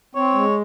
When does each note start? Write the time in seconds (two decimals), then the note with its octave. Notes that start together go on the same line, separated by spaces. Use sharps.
0.15 C4 C#5
0.34 G#3